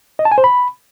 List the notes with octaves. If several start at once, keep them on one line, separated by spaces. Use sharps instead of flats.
D#5
A5
G#5
C5
B5